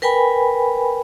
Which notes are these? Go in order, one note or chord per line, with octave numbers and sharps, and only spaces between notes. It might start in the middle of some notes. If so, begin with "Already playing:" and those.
A#4 B4 G5 G#5 B5